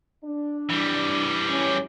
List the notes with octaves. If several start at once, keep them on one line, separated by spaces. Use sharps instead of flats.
D4
E3 G3
F#2 A2 C#4